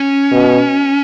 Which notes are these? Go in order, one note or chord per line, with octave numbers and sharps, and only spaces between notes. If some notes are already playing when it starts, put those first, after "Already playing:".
Already playing: C#4
B2